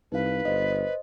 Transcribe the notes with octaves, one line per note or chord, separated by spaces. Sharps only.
C2 D#4 B4 F5
G1 C5 D#5